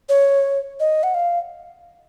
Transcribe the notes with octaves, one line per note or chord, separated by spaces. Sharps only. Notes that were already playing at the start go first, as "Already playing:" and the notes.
C#5
D#5
F#5
F5